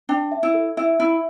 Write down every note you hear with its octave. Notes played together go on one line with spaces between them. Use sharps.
D4 G5
E5
E4
A4
E4 E5
E4 E5